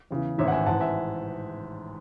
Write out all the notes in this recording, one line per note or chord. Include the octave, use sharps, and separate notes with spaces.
E2 C#3 E3
A1 G#2 D#3 C#5 E5
F#5
E5 G#5
A1 G#2 E3 F#5 A5
E5 G#5